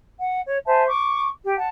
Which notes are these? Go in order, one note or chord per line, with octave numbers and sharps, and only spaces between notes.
F#5
C#5
C5 E5 G#5 A5
C#6 D6
G4
F#5 A5